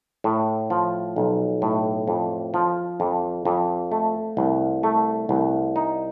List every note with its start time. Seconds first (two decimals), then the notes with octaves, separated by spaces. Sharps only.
0.24 A2
0.70 F3
1.16 B1
1.62 A2
2.08 F2
2.54 F3
3.00 F2
3.45 F2
3.92 A3
4.37 C2
4.83 A3
5.29 C2
5.76 D#4